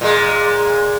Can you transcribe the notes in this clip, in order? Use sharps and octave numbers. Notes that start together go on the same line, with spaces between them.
A#2 G#3